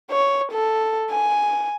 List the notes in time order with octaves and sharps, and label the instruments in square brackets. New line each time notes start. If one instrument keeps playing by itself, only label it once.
[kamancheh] C#5
A4
G#5